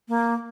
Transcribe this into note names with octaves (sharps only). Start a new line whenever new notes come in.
A#3